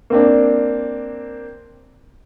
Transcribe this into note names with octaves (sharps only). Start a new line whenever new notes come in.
A#3 C4 D4